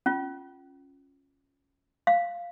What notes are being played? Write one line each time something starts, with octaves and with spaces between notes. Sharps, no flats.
C#4 F4
F5